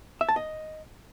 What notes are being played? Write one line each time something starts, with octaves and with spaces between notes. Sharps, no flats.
E5
A5
D#5